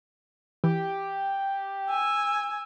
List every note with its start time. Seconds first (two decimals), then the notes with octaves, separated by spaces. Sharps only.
0.64 E3 G4
1.90 G#5 E6